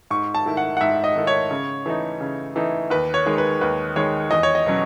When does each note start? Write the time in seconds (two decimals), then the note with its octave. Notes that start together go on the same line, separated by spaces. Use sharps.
0.11 G#2 C#6
0.35 A5
0.46 D#3 A3 E4
0.57 F#5
0.77 F#5
0.81 G#2 E5
1.04 D#5
1.16 D#3 A3 E4
1.27 C#5
1.51 C#3
1.86 E3 A3 D#4
2.21 C#3
2.56 E3 A3 D#4
2.90 D#2 B4
3.14 C#5
3.26 D#3 G#3
3.38 B4
3.61 D#2 B4
3.96 D#3 G#3 C#5
4.31 E2 D#5
4.43 C#5
4.55 D#5
4.66 B2 F#3 C#4